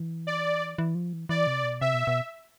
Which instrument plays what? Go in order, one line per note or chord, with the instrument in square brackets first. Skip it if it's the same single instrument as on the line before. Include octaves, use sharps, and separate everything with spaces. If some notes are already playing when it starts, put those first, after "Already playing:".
Already playing: [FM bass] E3
[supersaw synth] D5
[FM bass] E3
F3
E3
[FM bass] E3 [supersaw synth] D5
[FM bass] C3
B2
[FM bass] C3 [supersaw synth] E5
[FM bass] B2
B2